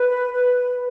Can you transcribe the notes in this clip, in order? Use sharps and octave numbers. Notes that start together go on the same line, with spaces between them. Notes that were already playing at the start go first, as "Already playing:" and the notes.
Already playing: B4
B4